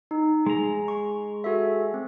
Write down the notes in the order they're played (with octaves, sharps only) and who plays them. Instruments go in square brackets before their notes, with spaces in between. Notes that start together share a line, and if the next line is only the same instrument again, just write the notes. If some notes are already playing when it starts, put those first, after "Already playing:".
[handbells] D#4
[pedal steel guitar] G#3 A#5
[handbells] C#6
F#4 A4 E5
C4